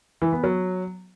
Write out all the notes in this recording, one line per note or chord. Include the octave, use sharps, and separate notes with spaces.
E3
B3
F#3